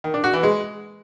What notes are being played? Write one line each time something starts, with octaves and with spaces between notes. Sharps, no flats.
D#3
D4
F#4
E3
G#3